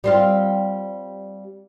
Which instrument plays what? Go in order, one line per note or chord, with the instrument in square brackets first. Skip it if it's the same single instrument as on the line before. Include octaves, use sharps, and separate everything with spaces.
[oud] G3 C4 F4